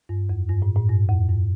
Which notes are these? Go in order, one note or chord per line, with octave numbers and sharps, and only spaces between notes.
G2
F2
G2
A2
A2
G2
F2
G2